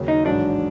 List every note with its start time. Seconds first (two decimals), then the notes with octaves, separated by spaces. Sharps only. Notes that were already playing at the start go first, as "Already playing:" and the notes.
Already playing: D#2 C#3 F#3
0.08 D#4
0.25 A1 G#2 D#3 F#3 D4